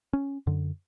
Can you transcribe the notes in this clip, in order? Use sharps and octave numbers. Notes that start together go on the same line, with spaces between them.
C#4
F#2 D3